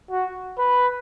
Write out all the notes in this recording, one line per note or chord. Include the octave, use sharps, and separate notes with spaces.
F#4
B4